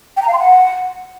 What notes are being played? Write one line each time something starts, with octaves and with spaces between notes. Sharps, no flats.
G5
A#5
F5
C6
F#5